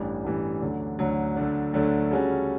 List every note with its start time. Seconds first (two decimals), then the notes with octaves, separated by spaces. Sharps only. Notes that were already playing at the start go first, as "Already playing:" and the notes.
Already playing: A1 G2 E3 G3
0.24 A1 G2 E3 G3
0.61 D2 D3 F#3
0.99 D2 D3 F#3
1.36 D2 D3 F#3 A3 D4
1.73 D2 D3 F#3 A3 D4
2.11 C#3 G3 C#4 F#4 A4